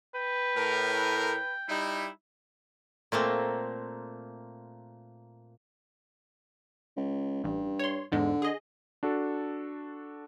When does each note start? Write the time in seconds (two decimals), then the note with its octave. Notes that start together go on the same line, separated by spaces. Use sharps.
0.15 B4 G5
0.56 A2 A#4
1.69 G3 D#4 E4
3.12 A#2 A3 A#3 C4
6.96 C#2
7.44 A1 G2
7.79 C#5 C6
8.12 E2 G#2 D3 G#3
8.42 G#4 D#5
9.03 D4 F#4 A4